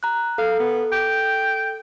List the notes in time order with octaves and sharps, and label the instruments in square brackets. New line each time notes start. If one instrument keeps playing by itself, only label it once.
[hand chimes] A#5 F#6
[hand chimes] A4 [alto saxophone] F5
[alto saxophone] B3
G5